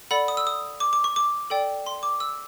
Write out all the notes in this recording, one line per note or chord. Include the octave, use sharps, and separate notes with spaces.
A4 D5 F#5 B5
D#6
E6
D#6
D6
D6
C#6
D6
A4 D5 G5
C6
D6
E6